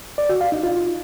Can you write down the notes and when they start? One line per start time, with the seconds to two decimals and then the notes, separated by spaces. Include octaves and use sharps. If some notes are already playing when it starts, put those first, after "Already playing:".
0.18 D5
0.29 F#4
0.41 F5
0.52 D#4
0.63 F4